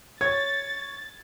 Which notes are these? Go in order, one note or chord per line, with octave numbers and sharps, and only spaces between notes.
C#5 G#6 A6